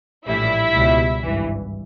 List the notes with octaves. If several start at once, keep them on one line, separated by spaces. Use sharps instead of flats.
A#1 A2 E3 G3 E4 E5
C#2 B2 G3
G#1 G2 E3